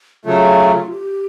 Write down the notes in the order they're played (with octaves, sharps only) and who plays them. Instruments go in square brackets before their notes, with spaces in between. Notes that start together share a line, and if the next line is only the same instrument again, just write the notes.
[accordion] C#3 F#3 A3 [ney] F4
[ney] G4